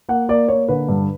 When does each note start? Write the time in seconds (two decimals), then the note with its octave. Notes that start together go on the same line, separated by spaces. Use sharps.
0.09 A#3 F#5
0.29 A#3 D5
0.48 A#3 C#5
0.68 D3 B4
0.89 G2